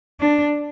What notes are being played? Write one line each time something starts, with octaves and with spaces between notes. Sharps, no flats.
D4